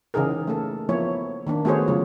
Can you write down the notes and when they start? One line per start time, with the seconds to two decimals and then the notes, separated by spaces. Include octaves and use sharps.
0.14 C#3 E3 D#4 G#4 A#4
0.47 A3 A#3 A4
0.89 F3 A#3 B3 E4 C#5
1.47 D#3 A#3 D4
1.65 A3 B3 F#4 G#4 C5 C#5
1.88 C#3 F#3 F4